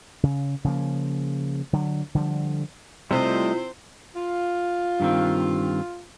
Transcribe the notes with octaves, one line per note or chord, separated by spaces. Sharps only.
C#3
C#3 F3 A#3
D3 F#3
D3 F3 G3
C3 G3 A3 C4 E4 F4 C5 D#5
F4
G2 D#3 C4